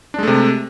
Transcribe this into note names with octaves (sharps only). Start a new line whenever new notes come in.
C3 G#3 A3 D4